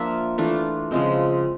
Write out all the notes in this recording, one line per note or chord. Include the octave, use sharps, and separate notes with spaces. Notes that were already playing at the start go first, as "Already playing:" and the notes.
Already playing: F3 A#3 D4 F4 E5
E3 A3 D4 F4
C#3 F3 G#3 C4